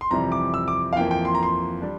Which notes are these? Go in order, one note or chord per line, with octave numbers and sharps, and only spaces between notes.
C6
F2 C3 E3 G3 A#5
D6
E6
D6
F5
F2 E3 A#3 G5
G5
C6
A#5
C6
G3 D4